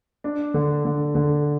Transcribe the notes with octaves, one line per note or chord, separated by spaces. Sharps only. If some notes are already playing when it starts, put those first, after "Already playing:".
D4
D3
D3
D3